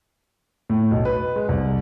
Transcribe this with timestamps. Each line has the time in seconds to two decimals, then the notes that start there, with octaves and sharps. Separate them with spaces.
0.70 A2
0.91 B1
1.05 B4
1.36 G#3
1.49 C2